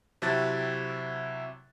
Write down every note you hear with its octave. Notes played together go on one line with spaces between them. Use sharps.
C3 F#3 E4 A5 F#6 A6